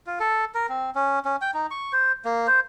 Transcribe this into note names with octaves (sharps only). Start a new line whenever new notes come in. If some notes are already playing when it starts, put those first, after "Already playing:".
F4
A4
A#4
C4
C#4
C#4
G5
D#4
C#6
C5
A#3
C5